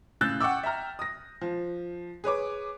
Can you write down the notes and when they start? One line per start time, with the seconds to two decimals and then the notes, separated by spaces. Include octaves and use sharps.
0.21 A2 C#3 E6 F#6 G6 A6
0.41 F#5 G5 C#6 D6 E6
0.63 E5 G5 A#5 F6
0.99 D#6 A#6
1.41 F3
2.24 G#4 B4 C#5 D6